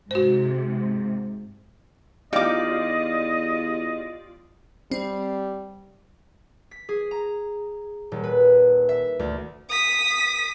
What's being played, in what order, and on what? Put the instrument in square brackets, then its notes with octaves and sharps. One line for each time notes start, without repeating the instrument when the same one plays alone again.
[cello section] G#2 C3 [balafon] F#4 C5
[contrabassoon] E2 [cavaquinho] D#4 D6 [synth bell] F4 G4 D5 [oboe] D#5
[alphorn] G3 [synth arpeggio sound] C4
[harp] B6
G#4
A#5
D#1
B4
E5
D2
[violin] D#6 B6